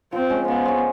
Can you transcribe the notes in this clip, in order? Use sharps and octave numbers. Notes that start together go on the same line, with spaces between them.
F3 C4
G#3 C#4
F3 B3
G#3 C#4